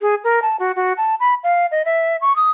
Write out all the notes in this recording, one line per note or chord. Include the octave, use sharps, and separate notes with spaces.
G#4
A#4
A5
F#4
F#4
A5
B5
F5
D#5
E5
C#6
D#6